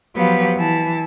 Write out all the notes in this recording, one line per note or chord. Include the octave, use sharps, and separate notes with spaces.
F3 F#3 B3 G4 B4 F5
E3 A5